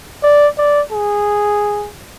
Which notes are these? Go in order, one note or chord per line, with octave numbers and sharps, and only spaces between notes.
D5
D5
G#4